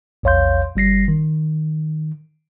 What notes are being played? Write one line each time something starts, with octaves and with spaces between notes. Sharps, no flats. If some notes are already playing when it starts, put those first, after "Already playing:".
A#1 E2 C#5 F5 C6 G6
G1 G3 A#6 C7
D#3